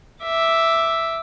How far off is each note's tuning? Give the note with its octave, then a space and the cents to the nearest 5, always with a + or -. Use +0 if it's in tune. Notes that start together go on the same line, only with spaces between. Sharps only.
E5 +0 D6 +0